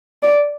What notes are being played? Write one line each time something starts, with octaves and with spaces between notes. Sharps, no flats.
D5